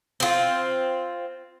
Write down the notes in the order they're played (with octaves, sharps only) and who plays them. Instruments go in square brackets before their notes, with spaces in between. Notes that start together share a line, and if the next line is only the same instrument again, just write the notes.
[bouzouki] C4 F4